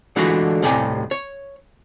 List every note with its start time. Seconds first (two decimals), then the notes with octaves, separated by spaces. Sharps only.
0.16 D3 E3 G#3 A3 F4 F#4
0.62 D#2 A2 C3 D5 G5 G#5
1.11 C#5